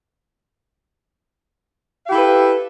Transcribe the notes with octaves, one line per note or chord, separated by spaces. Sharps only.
E4 G4 A4 B4 F5